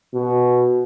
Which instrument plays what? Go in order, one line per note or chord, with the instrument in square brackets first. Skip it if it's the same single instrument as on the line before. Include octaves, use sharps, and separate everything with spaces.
[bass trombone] B2